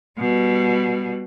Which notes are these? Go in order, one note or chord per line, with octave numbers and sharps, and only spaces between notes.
B2 G3